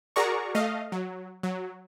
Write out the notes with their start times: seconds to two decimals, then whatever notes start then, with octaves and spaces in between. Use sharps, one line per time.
0.16 F#4 G#4 A#4 D5 A#5 C#6
0.55 A3 D#5 F5
0.92 F#3
1.43 F#3